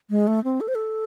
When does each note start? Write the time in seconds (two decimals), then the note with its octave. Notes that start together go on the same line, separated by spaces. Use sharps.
0.10 G#3
0.27 A3
0.44 C4
0.61 A4
0.68 C5
0.75 A4